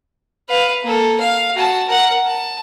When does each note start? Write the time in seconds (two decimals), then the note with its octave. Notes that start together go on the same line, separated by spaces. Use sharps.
0.49 B4 F5
0.83 A#3 A4
1.20 F5
1.54 F#4 A5
1.88 A#4 F#5
2.26 A5